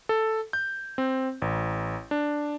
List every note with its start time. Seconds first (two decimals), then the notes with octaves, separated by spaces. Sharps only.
0.09 A4
0.53 G6
0.98 C4
1.42 A1
2.11 D4